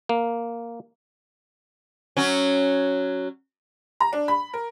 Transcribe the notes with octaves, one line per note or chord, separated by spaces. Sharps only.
A#3
F#3 C#4
A#5
D4
B5
A#4